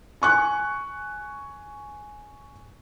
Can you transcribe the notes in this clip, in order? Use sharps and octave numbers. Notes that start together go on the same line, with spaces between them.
G#5 C#6 F#6